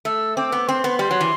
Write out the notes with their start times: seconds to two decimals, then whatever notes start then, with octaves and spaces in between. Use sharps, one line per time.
0.05 A3 E6
0.37 C4 D6
0.52 B3
0.68 C4 C6
0.84 B3
0.99 G3 C6
1.11 F#3
1.21 E3